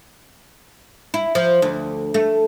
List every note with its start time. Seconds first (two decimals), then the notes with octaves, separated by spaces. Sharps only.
1.14 E4
1.35 F3
1.62 D2
2.14 A3